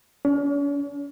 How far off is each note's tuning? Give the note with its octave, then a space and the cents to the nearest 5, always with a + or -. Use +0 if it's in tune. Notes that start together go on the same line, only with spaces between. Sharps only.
C#4 +45